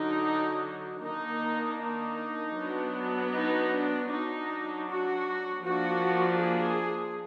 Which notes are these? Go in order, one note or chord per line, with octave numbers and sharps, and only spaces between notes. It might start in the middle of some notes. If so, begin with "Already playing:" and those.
Already playing: D3 F#3 D4 D#4
D#3 A#3 D4 D#4
D#4
F#3 B3 D4
D#4
D4
F#3 D4 D#4
F#4
F3 A#3 D4 F#4
G#4